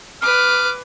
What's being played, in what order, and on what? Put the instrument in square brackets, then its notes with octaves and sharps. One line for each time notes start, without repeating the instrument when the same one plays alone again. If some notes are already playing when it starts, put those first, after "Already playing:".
[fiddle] B4 D6 [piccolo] F6